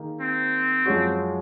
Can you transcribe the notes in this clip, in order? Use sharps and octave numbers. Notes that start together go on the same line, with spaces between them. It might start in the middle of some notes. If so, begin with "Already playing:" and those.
Already playing: D#3 A#3 D#4 G#4
C4
F#2 F3 G#3 C#4 F#4